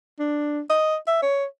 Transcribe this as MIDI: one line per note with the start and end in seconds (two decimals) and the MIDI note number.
0.19 0.60 62
0.70 0.96 75
1.07 1.21 76
1.22 1.45 73